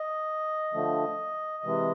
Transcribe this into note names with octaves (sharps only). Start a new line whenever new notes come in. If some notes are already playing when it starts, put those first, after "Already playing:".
Already playing: D#5
D3 F3 A3
C3 E3 G#3